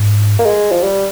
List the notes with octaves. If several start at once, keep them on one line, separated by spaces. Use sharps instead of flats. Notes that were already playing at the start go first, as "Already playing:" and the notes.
Already playing: G#2
A#3
G#3
F3
G3